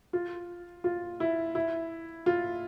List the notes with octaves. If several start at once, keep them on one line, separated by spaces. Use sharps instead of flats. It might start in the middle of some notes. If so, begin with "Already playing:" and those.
F4
F4
E4
E4
F4